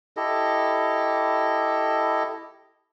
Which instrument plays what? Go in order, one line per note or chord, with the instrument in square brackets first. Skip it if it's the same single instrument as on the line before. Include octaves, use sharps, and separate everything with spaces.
[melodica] E4 G4 A4 D#5